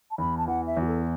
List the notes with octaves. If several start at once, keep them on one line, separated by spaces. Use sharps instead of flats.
A5
E2 B5
A5
E3 F#5
E5
E2 F#4
A4